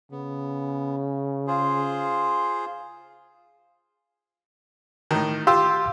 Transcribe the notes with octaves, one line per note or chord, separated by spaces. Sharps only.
C#3 B3
F4 G#4 C5
A2 D#3
F4 G4 F5 C6 E6